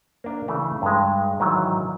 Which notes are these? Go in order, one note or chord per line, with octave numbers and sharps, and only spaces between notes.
A#3 D4
C#3 E3 A3
G2 G#3
G#2 D#3 E3 F#3